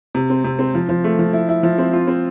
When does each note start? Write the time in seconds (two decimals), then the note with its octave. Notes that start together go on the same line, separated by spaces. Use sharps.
0.15 C3
0.30 C4
0.44 C3
0.59 C4
0.75 F3
0.89 F3
1.04 A3
1.19 F3
1.33 E4
1.49 E4
1.63 F3
1.78 C4
1.93 F4
2.07 C4